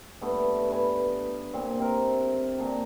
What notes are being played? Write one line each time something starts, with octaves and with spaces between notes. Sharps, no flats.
G2 A3 B3
G2 B4 G#5
A#2 C4
C3 C4 A#4
A#2 D4 A#5